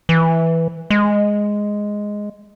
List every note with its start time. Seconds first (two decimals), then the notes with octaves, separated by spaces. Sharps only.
0.09 E3
0.90 G#3